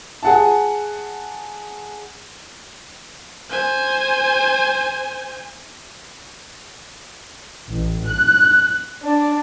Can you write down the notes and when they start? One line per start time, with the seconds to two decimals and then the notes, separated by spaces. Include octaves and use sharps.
0.23 G#4 F#5 A5
3.50 C5 G#5
7.70 A1
8.05 F#6
9.03 D4